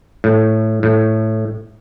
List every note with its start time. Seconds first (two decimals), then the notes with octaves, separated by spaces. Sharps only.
0.24 A2
0.83 A2